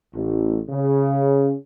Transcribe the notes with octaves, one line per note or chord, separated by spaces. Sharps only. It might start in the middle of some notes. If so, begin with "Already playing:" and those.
A1
C#3